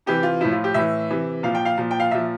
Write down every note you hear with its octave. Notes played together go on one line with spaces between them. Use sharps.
C3 E3 G4
F4
A2 F3 E4
F4
G4
A2 E3 E5
C3 E3
A#2 F3 F5
G5
F5
A#2 F3
G5
F5
A#2 F3 E5